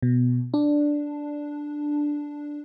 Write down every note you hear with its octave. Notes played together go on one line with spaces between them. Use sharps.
B2
D4